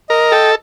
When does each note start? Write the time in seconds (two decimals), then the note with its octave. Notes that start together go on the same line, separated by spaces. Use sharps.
0.09 A#4 D#5
0.31 A4 G5